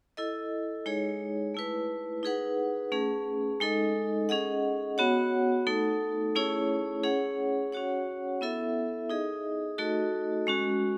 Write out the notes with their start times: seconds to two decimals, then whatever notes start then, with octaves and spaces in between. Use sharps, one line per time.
0.17 E4 A4 D#5
0.86 G#3 D#4 G#4 C#5
1.55 A3 E4 B4
2.23 D#4 G#4 B4 F#5
2.92 A3 C#4 G#4
3.60 G#3 D#4 A4 D#5
4.29 C#4 G#4 D#5 F#5
4.98 B3 F#4 C#5 F#5
5.67 A3 D#4 A4
6.35 A3 C#4 E4 G#4 C#5
7.04 C#4 G#4 C#5 F#5
7.72 C#4 F#4 C#5 F#5
8.41 B3 E4 A4 E5
9.10 D#4 G#4 D#5
9.78 A3 D#4 F#4 A4 D#5
10.47 G#3 C#4 F#4